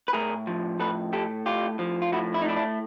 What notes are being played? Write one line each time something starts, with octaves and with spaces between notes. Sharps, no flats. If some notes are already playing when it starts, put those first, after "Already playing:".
B4
A2 G#4 A#4
F3
A2 A4 B4
A3 G4 A4
A2 F4 G4
F3
F4
A2 E4 F#4
E4
D#4
A3 D4 E4
D4 E4